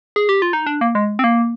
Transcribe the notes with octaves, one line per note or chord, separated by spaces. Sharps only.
G#4
G4
F4
D#4
D4
A#3
G#3
C4
A#3